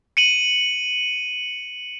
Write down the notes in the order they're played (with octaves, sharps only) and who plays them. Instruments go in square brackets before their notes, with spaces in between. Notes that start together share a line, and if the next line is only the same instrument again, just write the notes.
[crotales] C#7 D#7 F#7